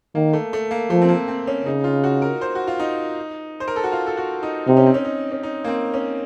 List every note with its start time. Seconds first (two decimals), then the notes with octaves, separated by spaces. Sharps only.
0.15 D#3 A#3
0.33 A3
0.53 A3
0.71 A#3
0.90 F3 A3
1.02 C4
1.09 A#3
1.28 C4
1.47 C#4
1.65 C#3 D#4
1.84 F4
2.04 F#4
2.22 A#4
2.41 C5
2.55 F#4
2.67 F4
2.79 D#4
3.60 C5
3.68 A#4
3.76 A4
3.84 F#4
3.92 F4
4.07 A4
4.17 F#4
4.43 D#4
4.67 C3 D#4
4.77 C#4
4.86 C4
4.94 C#4
5.05 D#4
5.32 C#4
5.43 D#4
5.64 A#3
5.68 C4
5.94 C#4